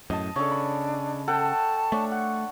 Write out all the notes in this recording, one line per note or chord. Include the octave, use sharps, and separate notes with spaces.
F#2 A2 D#5 A5
C#3 D4 A4 C#5
B5
A4 F#5 G5 A5
A3 D4 C#5
F#5